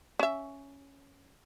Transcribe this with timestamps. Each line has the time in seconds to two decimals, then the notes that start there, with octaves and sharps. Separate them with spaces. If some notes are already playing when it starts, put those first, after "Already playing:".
0.19 C#4 E5